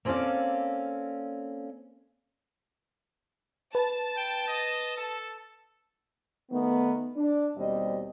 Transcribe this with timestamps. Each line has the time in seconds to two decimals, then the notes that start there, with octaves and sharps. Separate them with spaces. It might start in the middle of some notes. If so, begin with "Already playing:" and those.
0.05 A#3 C4 C#4 A4 D5 F5
3.75 B4 A5
4.17 G5
4.48 D#5
4.97 A4
6.52 D#3 A3 B3
7.16 D4
7.57 D#2 B2 G3 C4 D#5